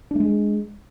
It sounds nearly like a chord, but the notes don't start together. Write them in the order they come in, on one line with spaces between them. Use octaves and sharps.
D4 A3 G#3